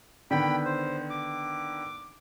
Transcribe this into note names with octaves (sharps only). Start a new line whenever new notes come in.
D3 D#3 B3 G5 B5
C5
D6